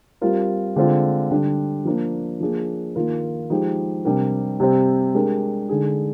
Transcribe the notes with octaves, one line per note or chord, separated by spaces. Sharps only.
G3 C4 F4 A#4
D3 G#3 C4 F4
D3 G3 D4 G4
F3 A#3 D4
F3 A#3 D4 G#4
D#3 A#3 F4 A#4
F3 G#3 D#4 G4
C3 G3 D4 G4 A#4
C3 G3 C4 G4
G#3 D4 G4 A#4
D3 G#3 D#4 G#4